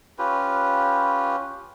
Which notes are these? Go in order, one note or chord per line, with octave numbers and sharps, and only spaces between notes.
C#4 F4 G4 B4